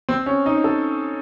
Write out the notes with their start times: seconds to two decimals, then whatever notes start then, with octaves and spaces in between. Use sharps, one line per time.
0.09 C4
0.26 C#4
0.46 D#4
0.64 A4